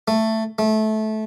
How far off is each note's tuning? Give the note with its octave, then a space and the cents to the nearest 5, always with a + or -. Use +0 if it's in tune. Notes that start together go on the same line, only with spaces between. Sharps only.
A3 +10
A3 -20